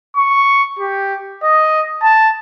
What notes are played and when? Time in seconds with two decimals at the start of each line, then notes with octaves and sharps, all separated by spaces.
0.17 C#6
0.79 G4
1.43 D#5
2.02 A5